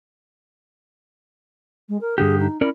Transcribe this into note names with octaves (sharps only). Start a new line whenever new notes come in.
G#3
A#4
G2 D3 G4 G#4
D#4
C#4 E4 A#4 D5